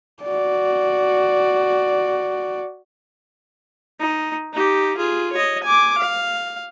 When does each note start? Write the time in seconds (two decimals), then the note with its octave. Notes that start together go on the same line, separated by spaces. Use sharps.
0.23 F#4 D5
4.00 D#4
4.53 D#4 G4
4.97 F4 G#4
5.33 C#5 D#5
5.63 G#5 D6
5.98 F5